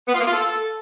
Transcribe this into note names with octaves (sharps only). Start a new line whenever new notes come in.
B3
F4
A#3
F4
A4